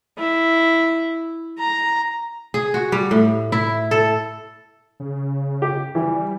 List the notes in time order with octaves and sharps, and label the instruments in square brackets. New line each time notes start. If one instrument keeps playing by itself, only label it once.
[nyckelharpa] E4
A#5
[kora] G#4
F#4
G3
A2
E4
A4
[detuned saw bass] C#3
[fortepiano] G4
[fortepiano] E3 [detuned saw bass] G3